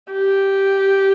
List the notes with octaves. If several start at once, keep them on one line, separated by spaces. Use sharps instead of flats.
G4